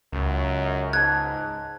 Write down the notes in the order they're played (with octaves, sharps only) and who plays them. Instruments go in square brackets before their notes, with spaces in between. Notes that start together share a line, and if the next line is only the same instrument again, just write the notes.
[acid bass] C#2 [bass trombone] F#2
[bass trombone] G#2 [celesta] A5 F#6 [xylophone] G#6